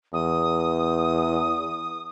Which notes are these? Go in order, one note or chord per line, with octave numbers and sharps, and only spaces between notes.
E2 D#6